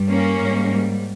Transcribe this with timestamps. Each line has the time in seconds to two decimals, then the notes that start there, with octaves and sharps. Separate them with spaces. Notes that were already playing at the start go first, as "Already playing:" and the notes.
Already playing: G2 G3
0.10 A#3 C#4
0.41 G#2 G3